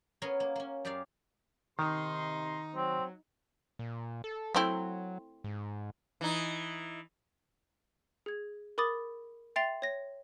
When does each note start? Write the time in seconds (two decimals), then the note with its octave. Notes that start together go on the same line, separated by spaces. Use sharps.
0.22 B3 C#4 G#4 A#4 C#5
0.40 A#3
0.56 A#3 C#4
0.85 F#2 G4 G#4 D5 F5
1.79 C3 D#3 D#4 A#5 C6
2.76 F#3 C4
3.79 A#2
4.24 A4
4.55 F#3 A3 C4 E4
5.44 G#2
6.21 E3 D#4
8.26 G#4 G#6
8.78 A#4 B5 D6 D#6 A6
9.56 E5 G5 C6 A6 C7 F7
9.82 C#5 A#6